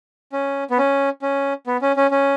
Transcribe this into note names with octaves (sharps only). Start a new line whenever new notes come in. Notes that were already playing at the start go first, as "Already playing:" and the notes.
C#4
B3
C#4
C#4
B3
C#4
C#4
C#4